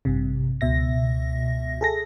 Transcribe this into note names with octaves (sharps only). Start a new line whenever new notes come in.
A1 G2 C3
C#2 B2 E5 A#6
G#4 A4 A#6